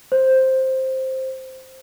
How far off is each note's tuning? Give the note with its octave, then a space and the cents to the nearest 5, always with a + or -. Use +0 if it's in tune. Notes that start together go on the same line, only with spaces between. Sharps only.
C5 +5